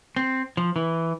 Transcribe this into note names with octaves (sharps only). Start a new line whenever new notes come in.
C4
F3
E3